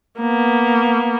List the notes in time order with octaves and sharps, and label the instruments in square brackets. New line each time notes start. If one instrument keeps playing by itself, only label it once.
[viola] A#3 B3